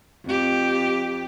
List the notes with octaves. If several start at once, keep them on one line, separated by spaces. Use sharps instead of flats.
F2 G4